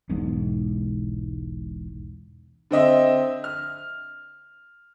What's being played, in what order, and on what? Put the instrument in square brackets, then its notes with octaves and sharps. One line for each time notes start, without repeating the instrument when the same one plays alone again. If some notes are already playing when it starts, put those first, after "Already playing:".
[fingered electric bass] E1 B1 E2 G#2
[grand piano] D3 C4 D#5 E5
F6